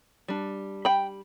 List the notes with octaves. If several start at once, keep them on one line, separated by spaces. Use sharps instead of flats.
G3 D4
G5 B5